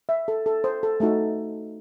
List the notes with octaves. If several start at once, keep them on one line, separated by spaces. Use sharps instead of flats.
E5
A4
A4
C5
A4
A3 D#4 F#4 A4